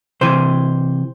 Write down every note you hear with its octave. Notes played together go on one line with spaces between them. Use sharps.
C3 E3 C5